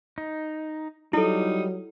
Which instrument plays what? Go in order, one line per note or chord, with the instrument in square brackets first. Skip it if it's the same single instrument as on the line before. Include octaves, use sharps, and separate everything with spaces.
[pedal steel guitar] D#4
[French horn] F#3 [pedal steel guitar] G3 [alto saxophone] D#4 [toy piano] E4 A4